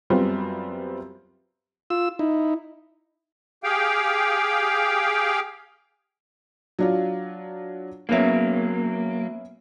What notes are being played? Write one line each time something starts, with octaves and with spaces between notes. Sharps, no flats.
F#2 G3 B3 C4 F4
F4 E6
D#4 E4
G4 G#4 F5 G5
F#3 D4 F4
F#3 A#3 B3 C#4 E5